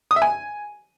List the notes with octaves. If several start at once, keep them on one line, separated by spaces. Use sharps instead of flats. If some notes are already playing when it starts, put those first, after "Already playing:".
D#6
E5
G#5